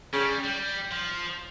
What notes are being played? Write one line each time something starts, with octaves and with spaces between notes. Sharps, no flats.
C#3 G3
G3
F3